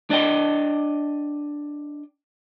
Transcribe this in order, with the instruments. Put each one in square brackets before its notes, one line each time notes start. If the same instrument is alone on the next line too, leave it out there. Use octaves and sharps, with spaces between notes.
[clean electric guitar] D4 D5 D#5 G5